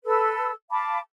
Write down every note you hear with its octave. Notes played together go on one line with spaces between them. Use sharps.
A4 B4 E6
F5 A5 B5 D6